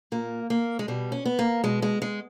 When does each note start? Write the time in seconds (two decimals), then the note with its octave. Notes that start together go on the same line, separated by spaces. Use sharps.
0.12 A#2 A#3
0.50 A#3
0.79 G#3
0.88 B2 G3
1.12 C#4
1.25 B3
1.39 A#3
1.64 B2 G#3
1.82 G#3
2.02 G#3